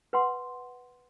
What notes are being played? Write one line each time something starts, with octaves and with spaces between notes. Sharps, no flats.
B4 F#5 C6